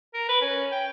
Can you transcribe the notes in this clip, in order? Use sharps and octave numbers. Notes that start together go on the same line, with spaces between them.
A#4
B4
C#4
G5